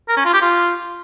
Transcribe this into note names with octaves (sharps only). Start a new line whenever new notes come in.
A#4
C#4
F4
G4
F4